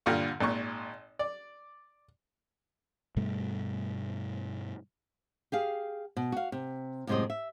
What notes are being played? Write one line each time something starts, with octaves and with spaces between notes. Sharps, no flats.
G2 A#2 D3 F4 F5
G#1 A#2 C#6
D5
G2 B2 G3 A3
G4 G#4 F5
B2
F#4 F5
C3
F#2 A2 C3 G#3 C5 D#5
E5